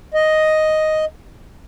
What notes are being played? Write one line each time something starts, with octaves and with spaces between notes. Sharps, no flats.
D#5